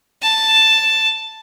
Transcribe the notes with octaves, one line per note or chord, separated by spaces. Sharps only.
A5